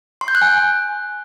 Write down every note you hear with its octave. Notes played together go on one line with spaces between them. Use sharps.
C6
G6
F#6
G#5